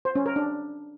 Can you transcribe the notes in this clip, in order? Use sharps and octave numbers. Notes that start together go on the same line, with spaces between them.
C5
C#4
A#4
D4